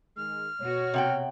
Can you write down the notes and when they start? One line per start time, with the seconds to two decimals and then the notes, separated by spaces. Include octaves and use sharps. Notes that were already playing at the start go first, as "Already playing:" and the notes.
0.17 D#3 G#3 F6
0.61 B2 F#4 C#5
0.94 C3 F#5 G5